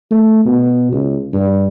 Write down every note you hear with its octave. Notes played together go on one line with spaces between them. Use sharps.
A3
B2
C#2
G2